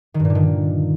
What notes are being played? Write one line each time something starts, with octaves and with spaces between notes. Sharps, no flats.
D#3
G2
A#2
D3
D#3